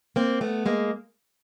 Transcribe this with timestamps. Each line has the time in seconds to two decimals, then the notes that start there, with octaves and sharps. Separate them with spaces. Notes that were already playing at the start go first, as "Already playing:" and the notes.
0.16 A#3 C4
0.41 A3 B3
0.66 G#3 A#3